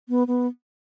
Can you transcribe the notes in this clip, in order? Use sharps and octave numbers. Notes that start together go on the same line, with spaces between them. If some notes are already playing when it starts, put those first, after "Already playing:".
B3
B3